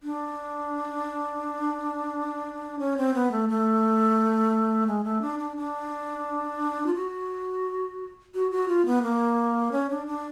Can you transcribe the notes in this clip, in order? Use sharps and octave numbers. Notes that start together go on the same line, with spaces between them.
D4
C#4
C4
B3
A3
A3
G#3
A3
D4
D4
D4
F4
F#4
F#4
F#4
F4
B3
A#3
C#4
D4
D4